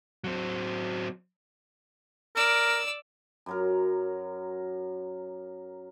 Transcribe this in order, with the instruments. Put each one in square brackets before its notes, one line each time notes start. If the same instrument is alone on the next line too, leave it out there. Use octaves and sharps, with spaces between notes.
[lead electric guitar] F#3 C4
[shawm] A#4 [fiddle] D5 E6
[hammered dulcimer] F#2 F#3 A#4